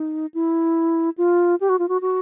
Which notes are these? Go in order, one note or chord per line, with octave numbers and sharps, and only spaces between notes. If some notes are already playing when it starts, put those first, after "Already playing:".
Already playing: D#4
E4
F4
G4
F#4
F4
F#4
F#4